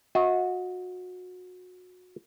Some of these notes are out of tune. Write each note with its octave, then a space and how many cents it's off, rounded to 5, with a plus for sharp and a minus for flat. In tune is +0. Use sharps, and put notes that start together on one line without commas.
F#4 -25 D#5 +35 A#5 +0